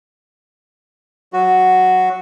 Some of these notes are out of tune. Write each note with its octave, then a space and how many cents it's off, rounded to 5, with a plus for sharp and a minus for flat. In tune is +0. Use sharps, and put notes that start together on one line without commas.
F#3 +0 F#4 +0